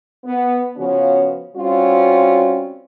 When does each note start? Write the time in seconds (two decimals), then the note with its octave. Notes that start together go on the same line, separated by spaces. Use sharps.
0.25 B3
0.77 C#3 F3 B3 C#4 F#4 B4
1.56 G3 C4 C#4 F4 F#4